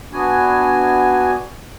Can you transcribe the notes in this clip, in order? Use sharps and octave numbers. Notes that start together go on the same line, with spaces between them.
B3 D4 F#4 G#5